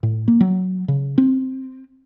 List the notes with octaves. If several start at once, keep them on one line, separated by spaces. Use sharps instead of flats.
A2
A#3
F#3
C#3
C4